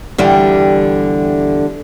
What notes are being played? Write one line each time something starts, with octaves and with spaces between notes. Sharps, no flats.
E2 D3 G3